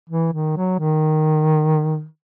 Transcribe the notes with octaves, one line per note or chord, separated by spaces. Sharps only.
E3
D#3
F#3
D#3